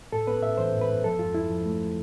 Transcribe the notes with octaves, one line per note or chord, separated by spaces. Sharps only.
A2 A4
B3 B4
A2 E5
E3 C5
A2
B4
B3
F3 A4
F2 F4
F2 E4
F3
A3